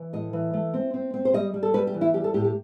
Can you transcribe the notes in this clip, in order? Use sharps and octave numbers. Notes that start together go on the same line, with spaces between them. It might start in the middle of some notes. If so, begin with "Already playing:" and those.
Already playing: E3
A2 D#5
E3
A3
C4
C4
C4
C5
G3 D#5
G3
A4
G3 B4
G4
E3
E4
G3 G4
A4
A2 G4
G4